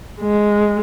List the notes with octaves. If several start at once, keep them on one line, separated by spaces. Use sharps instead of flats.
G#3